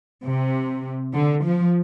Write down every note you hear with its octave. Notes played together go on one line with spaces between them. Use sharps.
C3
D3
F3